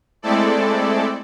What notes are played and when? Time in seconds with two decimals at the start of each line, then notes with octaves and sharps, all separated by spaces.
0.22 G#3 A3 C4 E4 A4 D5